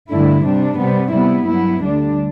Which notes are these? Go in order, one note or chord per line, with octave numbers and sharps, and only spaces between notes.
G2 D3 A3 E4
C3 G3 D4
C3 G3 B3
C3 G3 B3 E4
G2 F#3 B3 E4
D2 D3 G3 D4